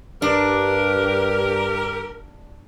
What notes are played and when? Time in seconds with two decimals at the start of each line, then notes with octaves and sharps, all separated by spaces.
0.22 G2 D4 G4 A#4